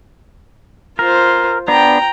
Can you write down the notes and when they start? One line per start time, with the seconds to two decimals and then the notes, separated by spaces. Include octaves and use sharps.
0.99 F4 A#4 C5
1.68 B3 D4 G5 A#5